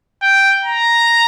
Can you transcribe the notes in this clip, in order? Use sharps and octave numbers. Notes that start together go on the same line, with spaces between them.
G5
A#5